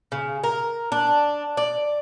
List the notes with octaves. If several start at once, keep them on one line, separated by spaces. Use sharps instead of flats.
C#3
A#4
D4
D5